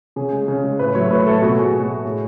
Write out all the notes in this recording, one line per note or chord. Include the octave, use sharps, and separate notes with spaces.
C#3 G#4
G#3
C#3
G#3
A2 B4
F#3 A3 C#5
A2 B4
F#3 A3 A4
B2 F#4
A3 G#4
B2
A3
A2 G#4